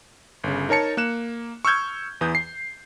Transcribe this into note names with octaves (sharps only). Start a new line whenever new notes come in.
G1 C#3
D#4 A#4 C#5 A5 C#7
A#3 F#6 E7
C#6 E6 F6 G6 G#6
E2 E3 D#6 G6
C7